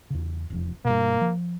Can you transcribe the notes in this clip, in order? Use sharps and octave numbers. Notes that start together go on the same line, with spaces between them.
E2 C#3
E1 F2 F3
G2 B2 A#3
F3